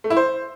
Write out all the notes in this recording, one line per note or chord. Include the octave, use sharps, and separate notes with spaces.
A3
E4
C5